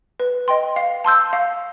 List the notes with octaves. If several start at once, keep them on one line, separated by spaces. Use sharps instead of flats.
B4
D#5 G5 C6
F5
A5 C6 E6 G6
F5